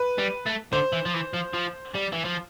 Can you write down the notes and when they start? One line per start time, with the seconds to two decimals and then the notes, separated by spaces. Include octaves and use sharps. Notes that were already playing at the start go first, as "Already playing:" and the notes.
Already playing: B4
0.18 G3
0.46 A3
0.73 D3 C5
0.93 E3
1.06 F3
1.14 E3
1.34 F3
1.54 F3
1.95 G3
2.13 E3
2.25 F3